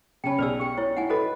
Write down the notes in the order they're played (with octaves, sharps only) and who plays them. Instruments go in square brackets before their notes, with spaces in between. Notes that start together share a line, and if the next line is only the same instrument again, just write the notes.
[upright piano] C#3 C#4 B5 [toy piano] G5 A5
[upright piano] B1 G#4 [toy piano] B4 D5 E6
[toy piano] G4 G5
E4 C#5
[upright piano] E4 [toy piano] F#5 G#5
[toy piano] F#4 A4 D#5 [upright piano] B4 B5